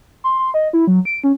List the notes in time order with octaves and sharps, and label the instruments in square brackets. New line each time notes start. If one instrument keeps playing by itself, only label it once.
[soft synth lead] C6
C6
D#5
E4
F#3
D7
C#4